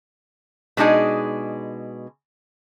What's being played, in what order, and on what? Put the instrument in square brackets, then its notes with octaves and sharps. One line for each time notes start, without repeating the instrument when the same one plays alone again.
[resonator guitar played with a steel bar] B2 G#3 D4 D#4 G#4